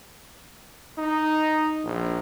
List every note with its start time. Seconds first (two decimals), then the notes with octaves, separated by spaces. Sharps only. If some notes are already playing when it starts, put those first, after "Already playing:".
0.98 D#4
1.84 A#1